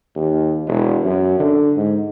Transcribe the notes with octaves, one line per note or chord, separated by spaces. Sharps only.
D#2
E1
F#2
D3
G#2